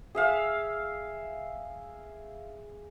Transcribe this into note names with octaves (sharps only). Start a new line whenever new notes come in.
G#4 E5 F5